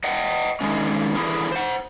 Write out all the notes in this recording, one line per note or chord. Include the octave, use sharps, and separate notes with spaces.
D#5 F#5 G5
D3 D#3 G#3 C#4
D3 E3 D#4 E4 G#4 A#4
C5 F#5